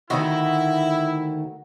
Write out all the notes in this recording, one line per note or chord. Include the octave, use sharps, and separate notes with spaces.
D2 D#3 A3 E4 F#4 D#5